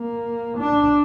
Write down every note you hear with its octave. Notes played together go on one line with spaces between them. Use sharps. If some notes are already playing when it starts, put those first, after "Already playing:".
Already playing: A#3
D4